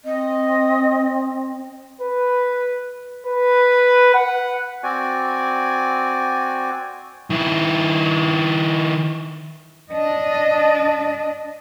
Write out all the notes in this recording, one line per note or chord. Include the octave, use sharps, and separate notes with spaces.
C4 D#5
B4
B4
F#5
C4 F#4 D5 G#5
D#3 E4
D4 D#5